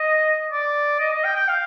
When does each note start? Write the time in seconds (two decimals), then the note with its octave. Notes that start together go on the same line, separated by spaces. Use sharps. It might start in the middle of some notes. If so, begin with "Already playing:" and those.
Already playing: D#5
0.52 D5
1.00 D#5
1.13 D#5
1.24 G5
1.36 G5
1.49 F5